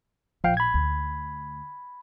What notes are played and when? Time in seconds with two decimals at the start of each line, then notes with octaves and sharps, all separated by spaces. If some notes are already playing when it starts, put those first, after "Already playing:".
0.44 A#1 F3 F5 G5
0.57 B5 G#6
0.74 D2